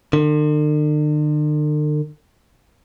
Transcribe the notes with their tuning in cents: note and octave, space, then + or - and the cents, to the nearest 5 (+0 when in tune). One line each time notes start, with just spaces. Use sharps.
D3 +45